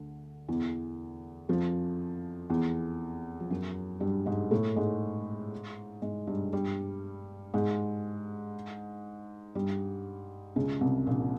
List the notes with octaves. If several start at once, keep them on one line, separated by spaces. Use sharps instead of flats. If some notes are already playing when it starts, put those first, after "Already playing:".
Already playing: D2 D3
E2 E3
F2 F3
E2 E3
F3
F#2 F#3
G2 G3
G#2 G#3
A2 A3
G#2 G#3
G#2 G#3
G2 G3
G2 G3
G#2 G#3
G2 G3
C#2 C#3
C2 C3
A#1 A#2